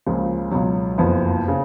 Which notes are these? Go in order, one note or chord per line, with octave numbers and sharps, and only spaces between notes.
C#2 C#3 F3 A#3
C#2 B2 F#3
F#1 F2 F3 B3 F4
C#3